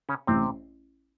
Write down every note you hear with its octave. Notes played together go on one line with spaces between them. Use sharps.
C#3 C#4
A1 C3 C4